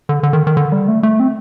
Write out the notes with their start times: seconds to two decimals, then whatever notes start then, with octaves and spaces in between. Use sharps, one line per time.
0.09 D3
0.23 D3
0.33 D#3
0.47 D#3
0.57 D3
0.72 G3
0.88 A3
1.03 A3
1.20 C4